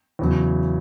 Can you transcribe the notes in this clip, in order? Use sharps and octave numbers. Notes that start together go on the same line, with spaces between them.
E2 C#3 F#3